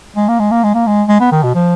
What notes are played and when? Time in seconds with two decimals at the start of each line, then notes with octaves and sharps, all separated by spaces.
0.16 G#3
0.28 A#3
0.40 G#3
0.51 A#3
0.64 G#3
0.74 A#3
0.87 G#3
1.08 G#3
1.20 B3
1.32 D#3
1.43 B2
1.55 F3